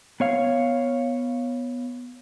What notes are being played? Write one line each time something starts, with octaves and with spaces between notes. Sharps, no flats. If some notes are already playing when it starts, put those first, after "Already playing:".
B3 C#5 F5